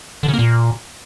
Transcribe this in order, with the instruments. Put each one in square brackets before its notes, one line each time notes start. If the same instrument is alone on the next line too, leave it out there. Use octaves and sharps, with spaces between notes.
[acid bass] D3
C#3
A#3
A#2